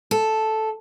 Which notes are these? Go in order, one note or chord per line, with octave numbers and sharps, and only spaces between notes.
A4